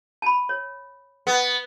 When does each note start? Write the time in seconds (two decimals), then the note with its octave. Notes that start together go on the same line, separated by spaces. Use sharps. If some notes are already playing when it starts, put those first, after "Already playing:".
0.22 A5 B5
0.49 C#5
1.27 B3